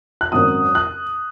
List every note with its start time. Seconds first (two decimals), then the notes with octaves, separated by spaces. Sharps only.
0.21 F#6
0.32 G#1 F#2 F#3 D#6
0.75 F#6